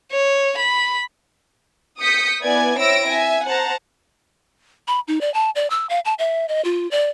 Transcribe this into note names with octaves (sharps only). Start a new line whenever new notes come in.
C#5
B5
D#6 G6 B6 C#7
B3 E4 B4 D5 G#5 G#6
C4 E4 C#5 E6 A#6 D7
E5 G#5
C5 F#5 A5 A#5
B5
D#4
D5
A5
D5
E6
F5
A5
E5
D#5
F4
D5